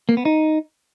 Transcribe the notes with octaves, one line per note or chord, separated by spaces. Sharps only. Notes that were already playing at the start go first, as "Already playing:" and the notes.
A#3
B3
D#4